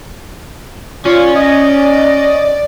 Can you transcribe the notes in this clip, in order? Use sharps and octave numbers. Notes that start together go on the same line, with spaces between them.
C#4 F4 D5
D#5